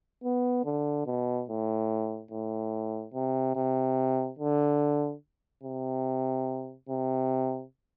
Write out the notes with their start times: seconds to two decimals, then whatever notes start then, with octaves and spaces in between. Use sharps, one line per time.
0.24 B3
0.64 D3
1.06 B2
1.49 A2
2.31 A2
3.14 C3
3.56 C3
4.39 D3
5.63 C3
6.89 C3